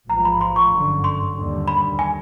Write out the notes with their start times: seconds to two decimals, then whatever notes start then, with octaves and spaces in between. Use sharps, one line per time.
0.09 A1 G#2 F3 A#5
0.25 B5
0.41 C6
0.56 C#6
0.72 G1 F#2 D3
1.04 C6
1.37 D#2 D3 G3
1.68 B5
1.99 G#5